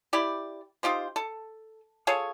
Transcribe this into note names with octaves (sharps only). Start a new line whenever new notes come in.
E4 G4 D5
D#4 F4 G4 C5
A4
F4 G#4 A4 C#5